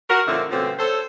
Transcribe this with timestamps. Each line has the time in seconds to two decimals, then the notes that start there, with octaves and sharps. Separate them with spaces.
0.10 F#4 A#4
0.27 A#2 D3 F3 C4 C#4 E4
0.51 B2 D3 F3 A3 C4 C#4
0.79 A4 C5 C#5